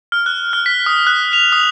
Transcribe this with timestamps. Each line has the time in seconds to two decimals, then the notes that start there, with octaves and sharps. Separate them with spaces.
0.12 F6
0.26 F#6
0.53 F6
0.66 B6
0.86 D#6
1.07 F#6
1.33 F7
1.52 D#6